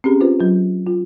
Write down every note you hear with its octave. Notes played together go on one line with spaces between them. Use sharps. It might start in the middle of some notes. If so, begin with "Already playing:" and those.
C4 C#4 G4 G#4
C4 F4 B4 C5
F#3 F4
F4